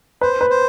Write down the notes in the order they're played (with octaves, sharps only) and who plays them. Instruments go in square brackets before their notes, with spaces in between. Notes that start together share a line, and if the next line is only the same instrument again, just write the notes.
[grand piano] B4 [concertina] C5
[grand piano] B4
[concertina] C5